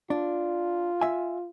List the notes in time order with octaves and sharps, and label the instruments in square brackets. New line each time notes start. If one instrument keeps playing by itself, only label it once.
[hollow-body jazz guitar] D4 [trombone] F4
[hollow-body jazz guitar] E5 G#5